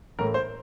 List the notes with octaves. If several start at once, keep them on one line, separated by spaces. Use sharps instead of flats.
A1 A2 A3 A#4
C5